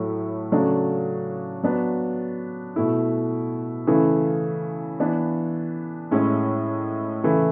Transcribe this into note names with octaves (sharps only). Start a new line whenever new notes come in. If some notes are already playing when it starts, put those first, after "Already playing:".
Already playing: A2 F#3 A3 E4
C#3 F#3 A3 D4
F#3 B3 D4
B2 A3 E4
C#3 E3 A3 E4
E3 B3 D4
A2 G#3 C#4 E4
C#3 E3 A3 E4